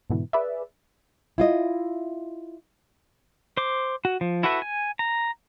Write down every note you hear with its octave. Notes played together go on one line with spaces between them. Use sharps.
G#2 B2 D3 E3
G#4 B4 D5 E5
E4 F4 D#5
C5 D6
F#4
F3
E4 F#4 A4 B4 E5
G#5
A#5